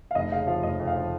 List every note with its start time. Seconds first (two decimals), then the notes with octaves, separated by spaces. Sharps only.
0.11 F5
0.15 F1 D#5
0.32 C#3 F5
0.47 F3 F5
0.63 F1 D#5
0.79 F2
0.87 F5
0.96 F3